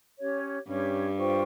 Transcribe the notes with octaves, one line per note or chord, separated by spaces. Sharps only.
C#4 G4 C#5
G2 C#4 G4 C#5
F4 C5 G5 C#6